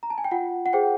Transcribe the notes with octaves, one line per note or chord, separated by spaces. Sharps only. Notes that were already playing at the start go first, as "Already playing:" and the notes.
A#5
A5
G#5
G5
F4 F#5
F#5
G#4 C5 G5